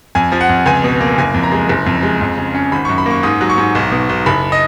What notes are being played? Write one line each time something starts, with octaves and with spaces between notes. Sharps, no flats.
F2 G#5
F3
F#5
F2
C#2 G#5
B2
A#3
F#1 G#5
F2
A#5
G#3
F#1
F2
G#3
F2
C#3
C#4
G#1 B5
F#2 C#6
B5
A#3 C#6
G#2 D#6
F#3
C#6
G#2
B1
B2
B1
F#1 B5
D#5